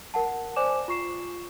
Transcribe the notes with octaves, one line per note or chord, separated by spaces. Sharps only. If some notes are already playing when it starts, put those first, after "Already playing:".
A#4 F#5 A5
C5 D5 G#5 D6 E7
F4 C#6 C7 E7